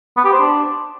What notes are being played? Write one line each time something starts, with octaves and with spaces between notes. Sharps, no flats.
B3
G4
C5
D4